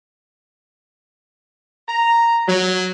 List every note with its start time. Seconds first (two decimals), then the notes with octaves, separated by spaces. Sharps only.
1.88 A#5
2.47 F#3